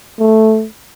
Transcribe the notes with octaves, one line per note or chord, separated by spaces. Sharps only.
A3